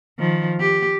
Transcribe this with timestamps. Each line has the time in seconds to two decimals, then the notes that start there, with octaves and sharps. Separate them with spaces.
0.19 D#3 F3
0.60 G4